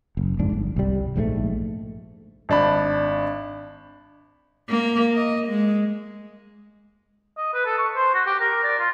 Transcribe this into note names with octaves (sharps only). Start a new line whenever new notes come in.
F#1
F2 G#2 D4
G1
C2 G3
A#1 G#2 D3 A3
G#1 D4 B5
A#3
D#5
G#3
D#5
B4
A4
C#6
C5
F#4
G4
A#4
D5
F4